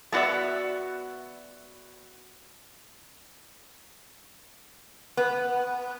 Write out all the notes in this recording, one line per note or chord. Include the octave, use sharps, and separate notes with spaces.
A3 B3 F#4 D5 E5
B3